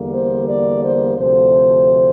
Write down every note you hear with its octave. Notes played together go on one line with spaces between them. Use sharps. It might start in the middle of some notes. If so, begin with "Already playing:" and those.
Already playing: E2 D3 G3 A#3
C5
D5
C5
D2 C3 F3 A3 C5